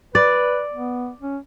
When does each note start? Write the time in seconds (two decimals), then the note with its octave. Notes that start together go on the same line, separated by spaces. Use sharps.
0.15 B4 D5
0.73 B3
1.20 C#4